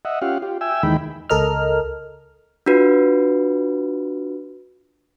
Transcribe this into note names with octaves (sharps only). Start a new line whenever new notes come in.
D#5 E5 F#5
C#4 F4 G4 F5 F#5
F4 G4
E5 G5 G#5 E6
D#2 D#3 E3 G#3 G5 B5
C#2 A4 A#4 D#5 F6
D4 F4 F#4 B4